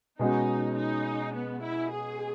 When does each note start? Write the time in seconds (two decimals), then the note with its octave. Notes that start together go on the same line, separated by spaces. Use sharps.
0.19 B2 G#3 C#4 D#4 F#4
0.77 D#4
1.34 B3
1.63 E4
1.92 G#4